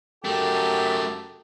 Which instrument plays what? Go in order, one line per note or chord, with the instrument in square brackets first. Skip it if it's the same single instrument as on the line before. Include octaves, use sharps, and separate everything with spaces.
[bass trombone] F#2 [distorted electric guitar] A3 D#4 [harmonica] G4 A4